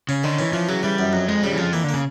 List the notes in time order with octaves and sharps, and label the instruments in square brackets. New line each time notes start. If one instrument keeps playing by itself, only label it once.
[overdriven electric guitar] C#3 [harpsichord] C#4
[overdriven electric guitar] D3 [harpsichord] D#3
[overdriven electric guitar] E3 [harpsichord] C#4
[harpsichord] E3 [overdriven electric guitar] F3
[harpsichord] C#3 [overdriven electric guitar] F#3
[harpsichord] E3 [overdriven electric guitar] G3
[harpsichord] F#2
[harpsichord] F2 [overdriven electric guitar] F#3
[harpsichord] F2 [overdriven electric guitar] G#3
[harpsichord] C#3 [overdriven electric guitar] G3
[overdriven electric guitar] E3
[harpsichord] F2 [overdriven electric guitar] F3
[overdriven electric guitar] E3 [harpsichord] A#3
[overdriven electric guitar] D3 [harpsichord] A#3
[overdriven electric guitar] C#3